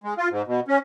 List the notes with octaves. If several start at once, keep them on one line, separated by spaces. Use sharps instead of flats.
G#3
F4
G#2
B2
C#4